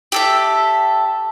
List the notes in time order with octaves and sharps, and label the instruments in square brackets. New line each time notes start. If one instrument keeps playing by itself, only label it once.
[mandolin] G4 A4 E5